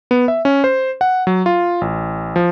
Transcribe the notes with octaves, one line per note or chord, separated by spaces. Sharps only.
B3
E5
C#4
C5
F#5
F#3
F4
A1
F3